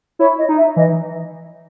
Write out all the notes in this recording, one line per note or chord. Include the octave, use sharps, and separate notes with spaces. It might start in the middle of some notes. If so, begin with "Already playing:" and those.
E4 C#5
D#5
D#4
E5
E3 D#5